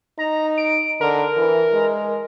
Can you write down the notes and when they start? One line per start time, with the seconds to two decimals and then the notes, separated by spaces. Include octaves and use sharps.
0.19 D#4 A#5
0.58 D7
1.01 D3 A#4
1.37 E3
1.73 G#3